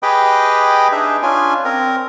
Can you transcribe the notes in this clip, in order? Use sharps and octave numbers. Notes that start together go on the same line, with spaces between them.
G4 G#4 B4 D#5 G5 B5
D4 D#4 G#4 E5
C#4 D4 F4 G#5
C4 A#4